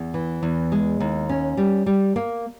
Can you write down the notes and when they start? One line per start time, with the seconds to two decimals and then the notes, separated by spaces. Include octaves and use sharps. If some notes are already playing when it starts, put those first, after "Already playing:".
Already playing: E2
0.14 E3
0.43 E2
0.72 G#3
1.00 D#2
1.29 C#4
1.57 G3
1.86 G3
2.16 A#3